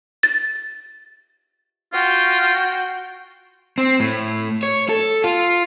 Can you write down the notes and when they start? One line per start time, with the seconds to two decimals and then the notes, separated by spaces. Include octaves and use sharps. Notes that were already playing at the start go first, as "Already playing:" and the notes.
0.23 A6
1.93 F4 F#4 G5
3.78 C4
4.00 A2
4.63 C#5
4.89 A4
5.24 F4